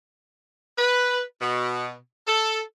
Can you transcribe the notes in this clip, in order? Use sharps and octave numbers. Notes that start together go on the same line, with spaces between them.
B4
B2
A4